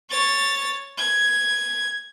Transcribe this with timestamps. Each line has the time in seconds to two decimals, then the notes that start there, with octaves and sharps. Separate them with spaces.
0.10 C#5 A6
0.98 G#6